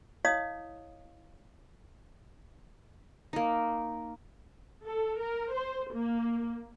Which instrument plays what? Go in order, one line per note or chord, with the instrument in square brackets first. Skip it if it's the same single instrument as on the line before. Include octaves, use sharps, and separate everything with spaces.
[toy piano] E4 C#5 D#5 F5 D#6
[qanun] A#3 D#4
[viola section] A4
A#4
C5
A#3